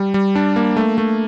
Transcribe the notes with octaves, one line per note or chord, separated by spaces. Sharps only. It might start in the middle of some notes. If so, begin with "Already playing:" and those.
Already playing: G3
G3
D4
A#3
A3
A3